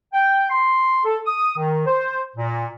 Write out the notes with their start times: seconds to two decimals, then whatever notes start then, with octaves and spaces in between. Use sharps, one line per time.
0.13 G5
0.50 C6
1.05 A4
1.26 D#6
1.57 D#3
1.86 C5
2.36 A#2